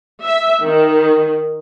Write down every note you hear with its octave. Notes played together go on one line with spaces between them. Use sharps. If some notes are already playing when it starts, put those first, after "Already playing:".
E5
D#3